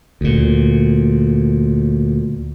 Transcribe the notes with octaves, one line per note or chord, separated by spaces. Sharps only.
D2 A#2